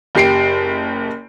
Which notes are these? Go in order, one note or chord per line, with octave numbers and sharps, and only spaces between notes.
F#1 G4 C7 D7